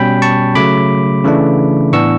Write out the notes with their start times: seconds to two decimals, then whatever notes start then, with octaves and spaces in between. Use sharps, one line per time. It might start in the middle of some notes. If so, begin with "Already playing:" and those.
Already playing: B2 G3 C#4 G5 B5
0.22 A5 C#6
0.55 C#3 F#3 A3 B5 D6
1.24 C#3 E3 A3 D4
1.93 A2 E3 B3 D4 C#6 E6